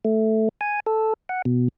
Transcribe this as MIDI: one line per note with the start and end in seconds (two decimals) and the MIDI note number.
0.05 0.49 57
0.61 0.80 80
0.86 1.14 69
1.29 1.42 78
1.45 1.68 47